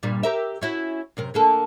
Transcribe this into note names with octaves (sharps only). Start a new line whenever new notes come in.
G2 A#2 G3
G4 A#4 E5
C#4 E4 F#4
F#2 C3 A#4
D3 A#3 A4